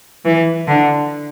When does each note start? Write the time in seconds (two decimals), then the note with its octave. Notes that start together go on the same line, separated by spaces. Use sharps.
0.25 E3
0.68 D3